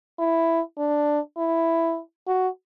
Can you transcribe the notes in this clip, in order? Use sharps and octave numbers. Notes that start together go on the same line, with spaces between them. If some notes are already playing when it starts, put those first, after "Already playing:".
E4
D4
E4
F#4